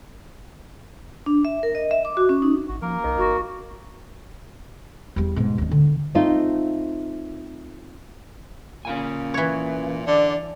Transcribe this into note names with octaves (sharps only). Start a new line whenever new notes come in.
D4
E5
A#4
D#5
E5
D6
F#4
C#4
D#4
G#1 F#4
F3 A#3 A#4
C2 D#3
G1 F#4
E2 G3
G#2 B2
D#2 D4
D3
A3 C4 D#4 F4
A#2 C#4 F5 G#5
E3 C#5
D3 D5